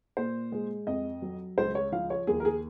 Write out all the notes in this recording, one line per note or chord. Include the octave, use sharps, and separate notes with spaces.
A#2 C5
G#3
F2 D#5
F#3
C#2 C5
C#5
F3 F5
C#5
D#2 G#4
A#4
G#4